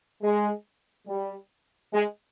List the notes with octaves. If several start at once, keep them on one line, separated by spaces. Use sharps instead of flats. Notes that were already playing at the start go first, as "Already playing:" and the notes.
G#3
G3
G#3